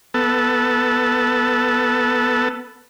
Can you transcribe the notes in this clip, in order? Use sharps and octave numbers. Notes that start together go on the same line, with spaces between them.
B3 A4